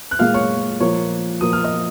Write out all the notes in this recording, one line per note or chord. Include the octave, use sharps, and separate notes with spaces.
F#6
A#2 G#3 F5 F6
C#5 C#6
A#2 F3 A#3 C#5 C#6
A#2 F3 A#3 D#6
F6
D#5 D#6